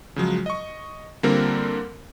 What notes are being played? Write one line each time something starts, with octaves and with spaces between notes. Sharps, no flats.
C#3 F3 F#3 G#3
D#5 C#6
D3 G3 A#3 C4 F4 A#4